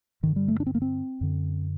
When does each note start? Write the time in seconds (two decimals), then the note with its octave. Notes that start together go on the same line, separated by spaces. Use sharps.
0.23 G2 D3 D#3
0.36 G3
0.48 A3
0.60 D4
0.66 C4
0.75 A#3
0.82 C4
1.21 F#2 D3